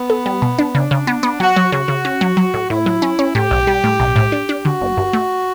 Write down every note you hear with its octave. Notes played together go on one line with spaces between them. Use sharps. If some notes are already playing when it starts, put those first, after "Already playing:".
Already playing: B3
A4
G3
B2
D4
C#3 D4
C#3
B3
B3
F#3 F#4
F#3
C#3 F#4
C#3
C#4
F#3
F#3
A2
A2 E4
F#3
C#4
C#4
A2 G4
B1
G3
A2
B1
A2
D4
D4
D3 F#4
G1
G2
A3